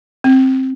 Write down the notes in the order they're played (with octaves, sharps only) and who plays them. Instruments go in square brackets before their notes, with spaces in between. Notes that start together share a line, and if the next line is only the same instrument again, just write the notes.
[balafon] C4